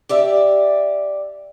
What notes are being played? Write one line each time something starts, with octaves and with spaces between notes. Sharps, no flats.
G4 D5 E5